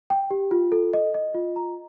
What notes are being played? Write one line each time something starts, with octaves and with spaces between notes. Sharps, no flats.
G5
G4
F4
A4
D#5
D#5
F4
A#5